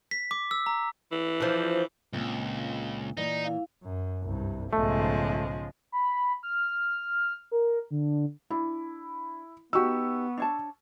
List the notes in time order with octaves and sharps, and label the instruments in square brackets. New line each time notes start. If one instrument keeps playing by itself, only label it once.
[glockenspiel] B6
D6
E6
A#5
[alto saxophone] E3
[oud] F3 D4
[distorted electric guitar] C#2 [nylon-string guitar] A#2 C4
[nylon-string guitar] A#2 E3 [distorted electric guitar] D#4 [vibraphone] D5
[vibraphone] E4 F5
[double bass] F#2
C2 G2
[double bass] B1 G#2 [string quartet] C#3 F3 G#3 [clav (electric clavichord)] A3
[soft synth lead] B5
F6
A#4
D3
[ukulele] D4 [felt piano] E4
[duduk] B3 [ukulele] D#4 F#4 G4 [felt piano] C#6 E6
[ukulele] D4 C#5 A5